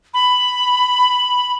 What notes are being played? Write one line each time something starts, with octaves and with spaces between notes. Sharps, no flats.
B5